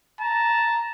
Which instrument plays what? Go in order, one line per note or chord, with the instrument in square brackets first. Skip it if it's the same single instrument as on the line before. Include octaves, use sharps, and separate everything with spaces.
[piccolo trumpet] A5 [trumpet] A#5